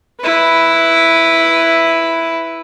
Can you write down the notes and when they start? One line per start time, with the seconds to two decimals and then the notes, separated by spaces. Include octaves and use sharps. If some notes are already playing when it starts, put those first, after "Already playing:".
0.21 E4 B4